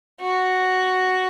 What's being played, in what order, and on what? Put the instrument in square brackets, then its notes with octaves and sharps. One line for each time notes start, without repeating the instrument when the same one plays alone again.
[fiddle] F#4